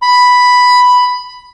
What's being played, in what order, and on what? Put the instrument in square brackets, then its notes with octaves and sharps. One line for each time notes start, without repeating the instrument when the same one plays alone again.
[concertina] B5